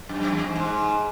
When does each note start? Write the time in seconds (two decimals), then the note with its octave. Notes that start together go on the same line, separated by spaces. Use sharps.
0.09 F#2
0.21 F#2
0.32 E2
0.44 G#2
0.55 G#2